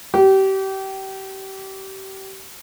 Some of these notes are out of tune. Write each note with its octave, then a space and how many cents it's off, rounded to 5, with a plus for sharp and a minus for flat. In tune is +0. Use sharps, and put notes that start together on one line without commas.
G4 -30